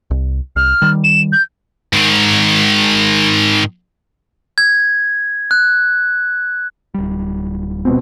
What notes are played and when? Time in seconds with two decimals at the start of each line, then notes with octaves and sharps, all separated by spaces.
0.11 C2
0.56 C2 F6
0.82 D#3 G3
1.04 E7
1.32 G6
1.93 G#2 D#3
4.58 G#6
5.51 F#6
6.94 D1 G3
7.85 B2 C4